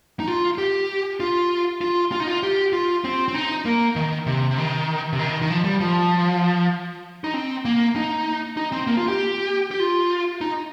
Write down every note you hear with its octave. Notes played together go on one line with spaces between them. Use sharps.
D#4
F4
G4
F4
F4
F4
D#4
F4
G4
F4
C4
C4
D#4
A#3
D#3
C3
C3
D#3
C3
D#3
D#3
F3
G3
F3
D#4
C4
A#3
D#4
D#4
C4
A#3
F4
G4
G4
F4
D#4